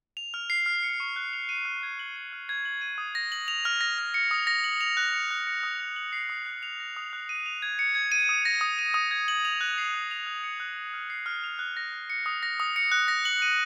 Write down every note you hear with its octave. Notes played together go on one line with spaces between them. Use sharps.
F7
F6
C7
F6
C#7
C#6
F#6
F7
D#7
F6
G#6
F#7
D#7
F6
G#6
F#7
D#7
D#6
A#6
F#7
F7
F6
A#6
F6
C#7
D#6
A#6
F#7
F7
F#6
C#7
F#6
C#7
D#6
A#6
F#7
C7
D#6
F#6
F7
A#6
D#6
F#6
D#7
F7
G#6
C#7
G#6
D#7
D#6
A#6
D#6
D#7
D#6
G#6
F#7
F7
F#6
C7
F#6
F7
F#6
C#7
F#6
F7
F6
C7
F6
F7
F#6
A#6
F#6
C#7
D#6
A#6
D#6
C#7
F#6
A#6
F#7
D#7